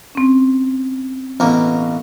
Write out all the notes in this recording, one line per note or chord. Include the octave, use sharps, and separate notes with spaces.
C4 C#4
A1 B2 A#3